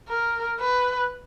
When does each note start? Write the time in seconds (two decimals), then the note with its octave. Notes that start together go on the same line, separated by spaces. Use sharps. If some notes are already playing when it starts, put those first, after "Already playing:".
0.08 A#4
0.60 B4